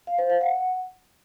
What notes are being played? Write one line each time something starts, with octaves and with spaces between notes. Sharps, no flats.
F5
C5
F5
F#5